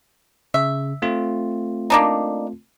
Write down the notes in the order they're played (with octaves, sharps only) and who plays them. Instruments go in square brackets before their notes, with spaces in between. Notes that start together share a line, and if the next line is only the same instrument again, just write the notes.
[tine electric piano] C#3 [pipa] E5
[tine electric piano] A3 C4 F4
[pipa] A#3 D4 D#4